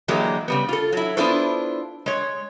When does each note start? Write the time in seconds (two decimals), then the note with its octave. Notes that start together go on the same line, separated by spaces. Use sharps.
0.08 D3 E3 F#3 G#3 A#3 G4
0.48 C#3 G3 B3
0.69 F4 A4
0.92 F#3 E4
1.17 B3 D4 E4 F4 A4 C5
2.06 G#3 C#5